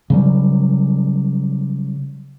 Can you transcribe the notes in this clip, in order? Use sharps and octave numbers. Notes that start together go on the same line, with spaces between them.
C#3 F#3 G3